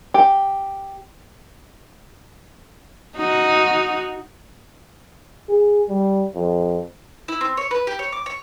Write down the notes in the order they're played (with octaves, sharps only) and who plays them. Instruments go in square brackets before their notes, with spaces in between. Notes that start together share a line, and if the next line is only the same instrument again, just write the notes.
[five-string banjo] G4
[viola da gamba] D#4 F#4
[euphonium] G#4
G3
F2
[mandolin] E4
C4
C#5
B4
G4
C#5
D6
C#5